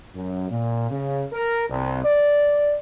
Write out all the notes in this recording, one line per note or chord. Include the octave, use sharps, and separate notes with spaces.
F#2
A#2
C#3
A#4
C2
D5